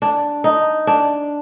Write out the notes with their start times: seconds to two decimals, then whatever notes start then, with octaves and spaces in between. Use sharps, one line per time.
0.02 D4
0.44 D#4
0.87 D4